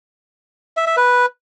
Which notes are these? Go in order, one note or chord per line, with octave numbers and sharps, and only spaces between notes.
E5
E5
B4